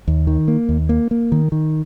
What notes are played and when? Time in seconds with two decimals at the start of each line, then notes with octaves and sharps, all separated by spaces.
0.08 D#2
0.27 D#3
0.48 A#3
0.69 D#2
0.89 A#3
1.11 A#3
1.32 D#3
1.52 D#3